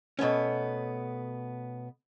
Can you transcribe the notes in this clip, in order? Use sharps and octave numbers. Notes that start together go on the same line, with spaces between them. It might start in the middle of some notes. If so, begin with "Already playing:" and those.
B2 A3 B3 C#4